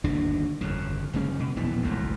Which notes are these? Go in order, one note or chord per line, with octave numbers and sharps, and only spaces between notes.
G1 D#2 B2 D4
G1 F2 C#3
F#1 C#3 G#3 C#4
B2
E1 A#1 E3 B3
G#1 C#2 F#2 A2